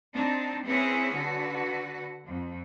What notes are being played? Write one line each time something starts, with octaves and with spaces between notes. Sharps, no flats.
C4 D4 D#4
C4 C#4 E4 G#4 B4 C#5
D3 F#4 B4
F2